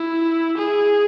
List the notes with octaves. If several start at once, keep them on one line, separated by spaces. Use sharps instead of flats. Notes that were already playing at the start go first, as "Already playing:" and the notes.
Already playing: E4
G#4